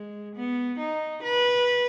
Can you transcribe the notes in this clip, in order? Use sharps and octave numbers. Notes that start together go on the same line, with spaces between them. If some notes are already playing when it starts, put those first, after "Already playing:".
Already playing: G#3
B3
D#4
B4